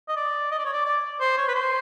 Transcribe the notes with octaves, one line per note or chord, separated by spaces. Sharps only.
D#5
D5
D#5
D5
C#5
D5
D5
C5
C#5
B4
C5